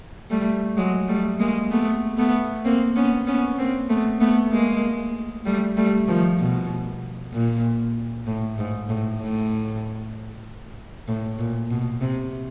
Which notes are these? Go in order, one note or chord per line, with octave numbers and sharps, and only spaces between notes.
G3 A3
F#3 G#3
G3 A3
G#3 A#3
A3 B3
A3 B3
A#3 C4
B3 C#4
B3 C#4
A#3 C4
A3 B3
A3 B3
G#3 A#3
G3 A3
G3 A3
D#3 F3
B2
A#2
A2
G#2
A2
A2
A2
A#2
B2
C3